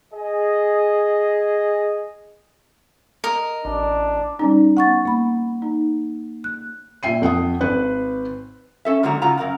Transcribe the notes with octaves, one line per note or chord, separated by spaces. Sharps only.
G#4 D#5
A#4 D#5
A1 D4
G3 C#4 D#4
B3 F#5 C#6 A6
A#3 B5
D#4
F#6
A#2 E5 G5 C7 D#7
F2 F#5 G5 D#6
G#1 B4 F#6
C#4 A4 E5
G#2 D3 F#3 A#3 F#4 A#5
A2 C#3 F4 F#5 A#5
F#2 A#4 F5 F#5